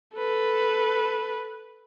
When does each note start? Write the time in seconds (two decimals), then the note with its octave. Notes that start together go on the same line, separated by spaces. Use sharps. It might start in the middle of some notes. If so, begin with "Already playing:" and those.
0.15 A4 B4